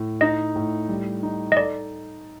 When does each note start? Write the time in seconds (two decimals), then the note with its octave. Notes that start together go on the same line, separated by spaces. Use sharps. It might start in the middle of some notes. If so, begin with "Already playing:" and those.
Already playing: A2
0.21 D#4 D#5
0.56 A2
0.89 G3
1.23 D#4
1.52 D#5
1.57 A4 D5